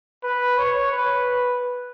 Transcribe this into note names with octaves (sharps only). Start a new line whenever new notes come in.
B4
C#5
B4